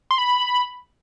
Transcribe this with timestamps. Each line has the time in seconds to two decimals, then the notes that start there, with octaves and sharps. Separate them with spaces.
0.11 C6
0.18 B5